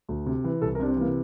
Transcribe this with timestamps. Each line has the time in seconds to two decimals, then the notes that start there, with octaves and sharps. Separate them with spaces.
0.09 D2
0.26 C3
0.44 E3
0.62 C2 A4
0.75 A#4
0.79 C3 D4
0.88 C4
0.97 E3 A#3